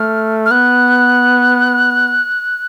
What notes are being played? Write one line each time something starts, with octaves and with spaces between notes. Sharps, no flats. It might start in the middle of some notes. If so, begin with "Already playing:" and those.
Already playing: A3 F6
F6
B3 F#6